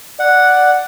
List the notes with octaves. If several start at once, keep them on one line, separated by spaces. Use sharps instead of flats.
D5 F#5